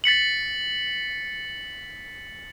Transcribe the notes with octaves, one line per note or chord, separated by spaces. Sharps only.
A6 B6 C#7 F#7